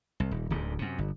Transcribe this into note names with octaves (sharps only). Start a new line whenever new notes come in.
C2
D#1
D1 D2 G#2
F#2 C3
G1